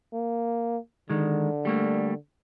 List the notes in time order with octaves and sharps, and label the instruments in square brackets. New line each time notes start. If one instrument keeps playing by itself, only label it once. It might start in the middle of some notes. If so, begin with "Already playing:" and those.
[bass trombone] A#3
[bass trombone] D3 [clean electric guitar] D#3 G#3
[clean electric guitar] G3 A3 A#3